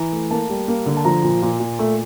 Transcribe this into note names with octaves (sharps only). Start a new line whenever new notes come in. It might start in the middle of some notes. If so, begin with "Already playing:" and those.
Already playing: E3 A#5
A3
A#3 A5
G3
A#3
D3
A5
F3 A#5
A#2
A#2
A#2
A3